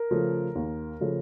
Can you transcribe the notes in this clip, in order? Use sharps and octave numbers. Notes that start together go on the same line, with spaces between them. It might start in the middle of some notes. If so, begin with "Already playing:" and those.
Already playing: A#4
C#3 F3 A3
D#2
C#3 F3 A3